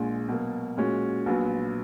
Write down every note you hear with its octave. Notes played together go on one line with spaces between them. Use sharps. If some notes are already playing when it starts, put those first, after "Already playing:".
Already playing: A#1 A#2 G#3
B2 F#3 A#3
A#2 G#3 C#4 F#4
A#1 A#2 F#3 B3